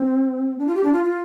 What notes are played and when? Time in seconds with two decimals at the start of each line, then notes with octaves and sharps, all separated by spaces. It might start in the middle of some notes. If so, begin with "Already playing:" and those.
Already playing: C4
0.58 D4
0.67 F4
0.75 G4
0.84 D4
0.93 F4
1.04 F4